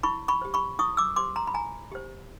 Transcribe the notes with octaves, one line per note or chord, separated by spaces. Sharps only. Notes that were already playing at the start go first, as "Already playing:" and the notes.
E4 B5 C#6
B5 C#6
G4 C5
B5 C#6
E4 C#6 D#6
D6 E6
G4 C5 C6 D6
A#5 C6
B5
E4 G#5 A#5
G4 C5